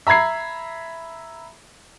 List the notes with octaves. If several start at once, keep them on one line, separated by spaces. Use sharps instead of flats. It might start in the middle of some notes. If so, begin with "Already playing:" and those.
E5 A#5 B5 G#6 C7